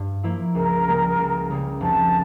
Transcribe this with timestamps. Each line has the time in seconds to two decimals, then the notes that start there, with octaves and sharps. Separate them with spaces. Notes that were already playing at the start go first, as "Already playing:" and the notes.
Already playing: G2
0.23 F3 A#3 E4
0.55 C#2 A#4
0.87 C#3 G3 A#3
1.19 C#2
1.50 C#3 G3 A#3
1.81 F1 A5